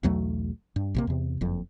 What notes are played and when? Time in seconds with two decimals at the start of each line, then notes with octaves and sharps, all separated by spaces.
0.03 B1 E2 F#3 A3
0.76 G2
0.95 A#1 C3 A#3
1.07 E2 C3
1.41 F#1 F2